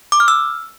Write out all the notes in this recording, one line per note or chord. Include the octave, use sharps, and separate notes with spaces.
D6
F6
E6